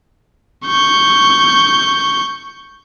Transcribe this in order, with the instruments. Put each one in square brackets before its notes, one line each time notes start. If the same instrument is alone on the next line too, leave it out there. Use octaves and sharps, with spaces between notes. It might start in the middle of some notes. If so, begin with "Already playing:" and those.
[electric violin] C#6 G6